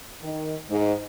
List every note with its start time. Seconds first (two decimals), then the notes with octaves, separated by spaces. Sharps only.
0.22 D#3
0.69 G#2